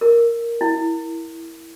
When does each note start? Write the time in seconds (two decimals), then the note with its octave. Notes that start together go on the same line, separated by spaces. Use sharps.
0.01 A#4
0.61 E4